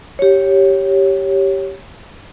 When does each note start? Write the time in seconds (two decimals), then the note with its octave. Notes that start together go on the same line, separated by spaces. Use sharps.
0.19 G4 C#5